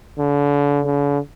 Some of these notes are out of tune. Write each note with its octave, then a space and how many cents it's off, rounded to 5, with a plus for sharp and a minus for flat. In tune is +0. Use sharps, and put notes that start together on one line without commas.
D3 -35
D3 -45